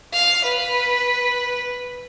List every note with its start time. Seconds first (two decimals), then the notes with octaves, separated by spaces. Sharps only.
0.13 F5
0.44 B4